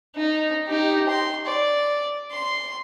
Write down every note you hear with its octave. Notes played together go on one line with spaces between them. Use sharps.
D#4
D#4 G4
C6
D5
C6